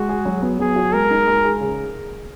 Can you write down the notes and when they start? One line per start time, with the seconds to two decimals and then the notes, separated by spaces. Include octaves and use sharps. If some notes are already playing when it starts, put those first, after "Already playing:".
Already playing: G#3 F#4
0.09 G#4
0.25 F#3
0.42 B3
0.59 F#3 G#4
0.76 F#4
0.93 G#3 A#4
1.11 D#4
1.27 G#3
1.44 G#4
1.61 C#3